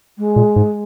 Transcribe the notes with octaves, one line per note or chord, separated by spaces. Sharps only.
G#3
A#2
G#2